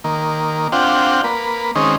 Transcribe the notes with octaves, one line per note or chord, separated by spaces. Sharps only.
D#3 A#3
C4 D4 F4 F#5 G5
A#3 B4
D#3 G#3 C4 C#4 D#4